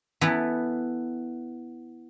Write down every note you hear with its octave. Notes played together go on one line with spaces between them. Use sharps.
E3 B3 A4